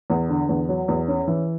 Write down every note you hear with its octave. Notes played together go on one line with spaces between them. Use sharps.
E2
D3
E2
F#3
E2
C#4
E3